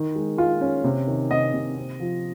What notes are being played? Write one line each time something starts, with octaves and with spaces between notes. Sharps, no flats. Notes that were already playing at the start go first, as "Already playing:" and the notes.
Already playing: D#3
G#3
G#3 F4
C#4
C3
D#3
C3 D#5
C3
C4
F3